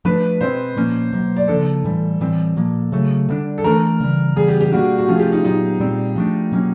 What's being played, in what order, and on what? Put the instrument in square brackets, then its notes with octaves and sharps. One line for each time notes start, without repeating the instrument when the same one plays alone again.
[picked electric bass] F3 A3 D4 [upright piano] B4
[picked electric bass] B2 G#3 C4 [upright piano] C5
[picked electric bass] A#2 F3 A#3 C#4
B2 F#3 A#3
[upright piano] D5
[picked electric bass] C#3 F3 A#3 D4 [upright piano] A4
[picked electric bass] A2 E3 G3
A2 E3 G3 C4
A#2 F3 A#3
C#3 F#3 A3
D3 G3 A#3 D4
[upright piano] A4
[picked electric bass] E3 A3 D4 [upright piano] A#4
[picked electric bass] C#3 E3 G3
[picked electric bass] C#3 E3 G3 B3 [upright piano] G#4
[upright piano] G4
G4
[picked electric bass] B2 G3 A#3 D4 [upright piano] F#4
[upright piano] F#4
[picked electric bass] C3 F3 A3 C#4 [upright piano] F4
[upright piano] G#4
G4
D#4
[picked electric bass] A#2 F#3 B3 [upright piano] D#4
[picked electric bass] A#2 G3 C4
F3 A3 D4
B2 F#3 A#3 C#4